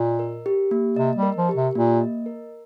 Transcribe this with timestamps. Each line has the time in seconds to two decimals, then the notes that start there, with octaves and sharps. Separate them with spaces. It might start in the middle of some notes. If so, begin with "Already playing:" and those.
Already playing: A#2 D#5
0.19 A#4
0.46 G4
0.71 A#3
0.96 C3 D#5
1.16 G3
1.23 A#4
1.36 F3
1.49 G4
1.55 C3
1.75 A#2 A#3
2.01 D#5
2.26 A#4